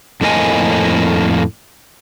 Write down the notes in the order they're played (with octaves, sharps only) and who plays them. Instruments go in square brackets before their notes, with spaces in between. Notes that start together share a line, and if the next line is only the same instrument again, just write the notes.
[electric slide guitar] F2 A2 A#3 E4 D#5 G#5